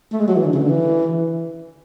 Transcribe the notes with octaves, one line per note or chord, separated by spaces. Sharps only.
A3
G#3
F#3
E3
D3
C#3
D3
E3